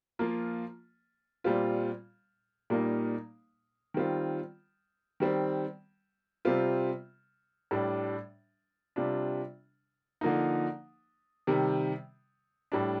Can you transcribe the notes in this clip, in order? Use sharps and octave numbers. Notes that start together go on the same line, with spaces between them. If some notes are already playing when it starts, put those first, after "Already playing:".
F3 A#3 F4
A#2 G3 C4 F4
A#2 G3 A#3 D#4
D#3 G3 C4 F4
D#3 G3 C4
C3 G3 C4 F4
A2 G3 D4
C3 G3 D4 F4
D3 F3 A#3 D#4
C3 D#3 G3
A2 G3 D4